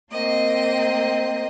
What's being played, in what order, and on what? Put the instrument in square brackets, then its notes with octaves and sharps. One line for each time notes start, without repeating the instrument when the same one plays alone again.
[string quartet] A#3 C4 D#5